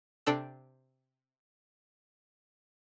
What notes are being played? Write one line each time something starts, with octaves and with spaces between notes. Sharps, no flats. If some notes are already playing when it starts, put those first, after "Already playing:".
C3 C4 D4 A4 E6